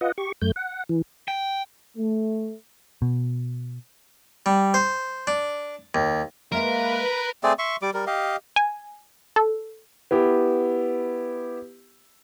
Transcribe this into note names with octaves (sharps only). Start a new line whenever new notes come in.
F4 B4 D#5 F#5
G4 C#6
F#2 A3 G6
F#5
E3
G5
A3
B2
G3
C5
D4
D#2
G#3 A#3 A#4 B4 E5 F5
A3 C4 G#4 D5
E5 C6 C#6
G3 D6
G3 A#4
G4 D#5 F5
G#5
A4
B3 E4 G4